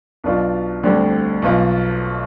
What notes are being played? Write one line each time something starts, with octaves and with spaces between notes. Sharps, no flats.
B1 B2 B3 D4 F4
D2 D3 G3 C4
B1 B2 B3 F4